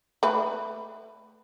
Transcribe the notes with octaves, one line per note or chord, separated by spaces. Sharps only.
A3 B4